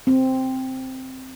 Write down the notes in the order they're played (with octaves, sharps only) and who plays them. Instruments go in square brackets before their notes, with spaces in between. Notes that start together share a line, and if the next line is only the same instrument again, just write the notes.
[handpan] C4